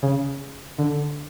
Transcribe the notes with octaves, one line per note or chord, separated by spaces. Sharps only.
C#3
D3